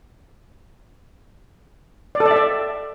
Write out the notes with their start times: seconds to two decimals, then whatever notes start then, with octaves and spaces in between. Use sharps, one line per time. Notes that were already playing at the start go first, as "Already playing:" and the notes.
2.15 D5
2.20 A4
2.26 D5
2.31 E5
2.36 D5